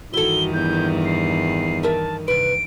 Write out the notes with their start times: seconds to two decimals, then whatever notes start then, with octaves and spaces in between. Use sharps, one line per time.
0.14 G2 D#3 E3 E4 F#4 A4 G7
0.54 E2 G6
1.05 C7
1.83 A#4 E5 A5
2.28 C3 B4 D7